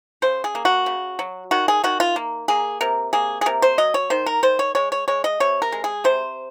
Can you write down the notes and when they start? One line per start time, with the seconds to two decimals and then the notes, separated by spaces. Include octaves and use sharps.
0.22 C#3 C5
0.44 G#4
0.55 A#3
0.65 F#4
0.86 C#3
1.19 F#3
1.51 D#3 F#4
1.68 G#4
1.84 D#3 F#4
2.00 F4
2.16 A#3
2.48 A#3 G#4
2.81 C3 A#4
3.13 A#3 G#4
3.41 G#4
3.46 C3 A#4
3.62 C5
3.78 F#3 D#5
3.94 C#5
4.10 D#3 C5
4.26 A#4
4.43 D#3 C5
4.59 C#5
4.75 G#3 C#5
4.92 C#5
5.08 G#3 C#5
5.24 D#5
5.40 C3 C#5
5.62 A#4
5.72 G#3
5.84 G#4
6.04 C3 C5